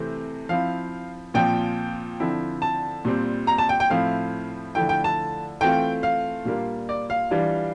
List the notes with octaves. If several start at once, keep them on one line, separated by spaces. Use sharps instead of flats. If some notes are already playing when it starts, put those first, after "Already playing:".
Already playing: C3 E3 A3 C4
F3 C4 E4 F5
A#2 F3 C4 G5
D3 F3 C4 E4
A5
A#2 G3 C4
A#5
A5
G5
G5
A2 F3 C4 E4 F5
D3 F3 A3 E4 G5
G5
A5
E3 A3 C4 F4 G5
F5
A#2 G3 A#3 D4 F4
D5
F5
E3 G3 D4 F4